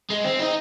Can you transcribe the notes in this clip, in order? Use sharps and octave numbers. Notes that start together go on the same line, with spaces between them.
G#3
C4
D#4